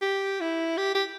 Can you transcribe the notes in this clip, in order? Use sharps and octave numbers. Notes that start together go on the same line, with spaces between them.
G4
E4
G4
G4